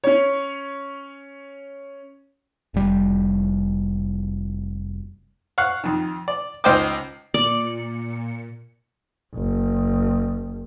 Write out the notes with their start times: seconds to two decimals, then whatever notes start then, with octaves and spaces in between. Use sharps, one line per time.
0.04 C#4 C#5
2.74 F1 G3
5.58 F5 F#5 C#6 F#6
5.83 F2 D#3
6.28 D5
6.64 C#2 D#4 C5 D#5 G5 D6
7.34 A#2 D5 C#7
9.35 F#1